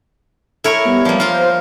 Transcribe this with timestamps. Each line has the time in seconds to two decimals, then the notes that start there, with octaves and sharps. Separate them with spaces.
0.64 E4 A4 A#4 C#5
0.85 G3 B3
1.05 F3 A#3
1.20 F4 A#4 C5